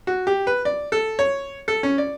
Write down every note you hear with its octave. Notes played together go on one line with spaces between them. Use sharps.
F#4
G4
B4
D5
A4
C#5
A4
C#4
D5